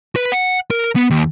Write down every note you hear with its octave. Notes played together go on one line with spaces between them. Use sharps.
B4
F#5
A#4
B3
D#2